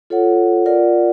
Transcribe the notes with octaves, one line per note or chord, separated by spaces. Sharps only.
F4 A4 C#5 F#5
F4 A#4 D5 F#5